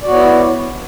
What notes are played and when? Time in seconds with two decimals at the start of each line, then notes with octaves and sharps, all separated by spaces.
0.03 D5
0.06 F#4
0.09 B3
0.12 C#5
0.15 E4